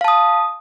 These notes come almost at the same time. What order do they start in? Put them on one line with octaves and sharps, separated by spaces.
F5 A5 D#6